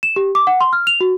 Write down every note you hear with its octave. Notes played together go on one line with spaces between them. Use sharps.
E7
G4
D6
F#5
C6
F6
F7
F#4